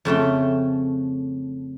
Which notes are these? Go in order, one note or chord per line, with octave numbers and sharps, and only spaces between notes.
F2 C#3 A3 G5